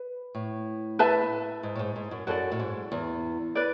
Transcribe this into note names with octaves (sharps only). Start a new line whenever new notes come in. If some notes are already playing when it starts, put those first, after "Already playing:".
Already playing: B4
A2
B4 E5 A5
G#2
A2
G#2
G#2
F#2
F#2 F#4 A4 D5
A2
G#2
E2
B4 D5